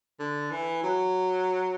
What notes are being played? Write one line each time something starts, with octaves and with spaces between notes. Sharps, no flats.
D3
E3
F#3